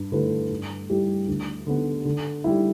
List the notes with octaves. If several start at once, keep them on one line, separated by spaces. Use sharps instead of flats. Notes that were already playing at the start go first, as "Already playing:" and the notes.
Already playing: G2
D3 A3 E4 B4
G2
G3 E4 G4
D2
D3 B3
D3
G3 E4